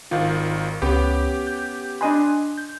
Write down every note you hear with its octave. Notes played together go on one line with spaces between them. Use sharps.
G#1 D#3 F4
C#2 B3 C#4 G4 B4
G6
D4 D#5 G#5 B5 C6 F#6
G6